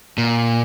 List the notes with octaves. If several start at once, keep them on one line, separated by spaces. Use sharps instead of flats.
A#2